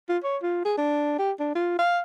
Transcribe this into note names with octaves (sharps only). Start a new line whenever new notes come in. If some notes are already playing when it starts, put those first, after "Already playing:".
F4
C#5
F4
G#4
D4
G4
D4
F4
F5